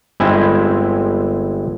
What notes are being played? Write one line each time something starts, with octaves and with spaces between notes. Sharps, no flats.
G1 G#3 C4 E4 E5 G#5